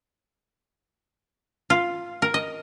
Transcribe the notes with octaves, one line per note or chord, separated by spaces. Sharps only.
F4
A#4
D#5